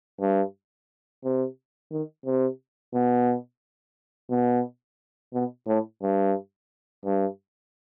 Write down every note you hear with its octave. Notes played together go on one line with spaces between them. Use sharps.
G2
C3
D#3
C3
B2
B2
B2
A2
G2
G2